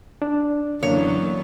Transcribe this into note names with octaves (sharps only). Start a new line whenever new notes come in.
D4
F#2 D3 E3 A#3 B3 D4 C#5